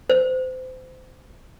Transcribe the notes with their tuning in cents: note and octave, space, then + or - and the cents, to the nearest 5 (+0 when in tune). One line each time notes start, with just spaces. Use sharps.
C5 -30